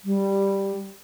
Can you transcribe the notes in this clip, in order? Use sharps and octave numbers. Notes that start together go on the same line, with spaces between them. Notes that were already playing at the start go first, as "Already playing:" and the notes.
G3